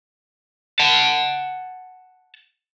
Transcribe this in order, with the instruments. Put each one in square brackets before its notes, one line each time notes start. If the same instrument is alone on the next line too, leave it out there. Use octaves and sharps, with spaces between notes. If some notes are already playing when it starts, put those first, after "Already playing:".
[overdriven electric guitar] F#5 A5